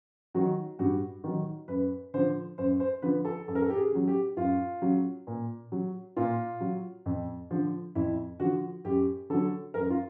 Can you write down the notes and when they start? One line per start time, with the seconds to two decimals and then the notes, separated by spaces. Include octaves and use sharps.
0.35 D#3 F#3 F#4
0.79 G2 F#4
1.24 D#3 F#3
1.68 F#2 B4
2.14 D3 F3 C5
2.58 F#2 C5
2.80 C5
3.02 D3 F3 B4
3.25 A4
3.48 F#2 A4
3.55 A#4
3.62 A4
3.70 G4
3.77 G#4
3.92 C#3 F#3
4.08 G4
4.37 F#2 F4
4.82 C#3 F#3
5.27 A#2
5.72 F#3
6.17 A#2 F4
6.60 F#3
7.06 F2
7.51 D3 F3
7.95 F2 E4
8.40 D3 F3 F#4
8.85 F#2 G4
9.30 D3 F#3 A4
9.74 F#2 A#4
9.90 F4